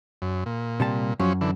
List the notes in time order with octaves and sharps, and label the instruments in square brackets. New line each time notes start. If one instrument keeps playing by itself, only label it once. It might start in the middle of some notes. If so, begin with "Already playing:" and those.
[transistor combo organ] F#2
A#2
[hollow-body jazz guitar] C3 G3 A5
[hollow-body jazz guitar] F#2 [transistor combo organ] F3 F#3 C#4
[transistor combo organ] D3 E3